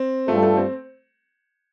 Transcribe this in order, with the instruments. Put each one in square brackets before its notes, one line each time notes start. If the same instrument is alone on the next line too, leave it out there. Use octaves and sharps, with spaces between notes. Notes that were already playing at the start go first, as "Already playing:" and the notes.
Already playing: [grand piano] C4
[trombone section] G2 G3 F4 A4 [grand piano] A3
[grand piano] A3
C4